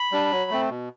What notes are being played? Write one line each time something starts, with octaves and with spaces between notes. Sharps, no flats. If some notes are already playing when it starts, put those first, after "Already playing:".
Already playing: B5
G3 D4
F#3
A3 C4
B2